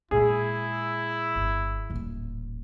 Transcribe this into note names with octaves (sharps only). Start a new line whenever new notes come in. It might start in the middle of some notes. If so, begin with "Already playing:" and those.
A#2 G#3 E4 G#4
G1
D#1 A1